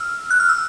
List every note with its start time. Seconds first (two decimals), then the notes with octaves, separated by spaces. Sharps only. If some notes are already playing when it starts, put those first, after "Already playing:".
Already playing: E6 F6
0.30 F#6
0.40 F6
0.49 E6